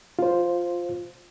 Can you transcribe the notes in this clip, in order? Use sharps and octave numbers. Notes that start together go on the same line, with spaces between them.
F4 C5